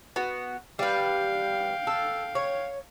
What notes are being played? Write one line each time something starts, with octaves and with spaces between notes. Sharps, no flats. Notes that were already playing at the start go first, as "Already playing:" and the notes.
B3 F#4
G3 B4 F5 G5
A4
C#5